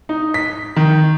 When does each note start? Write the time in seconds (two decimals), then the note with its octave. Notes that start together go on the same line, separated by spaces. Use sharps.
0.09 D#4
0.34 B6
0.76 D#3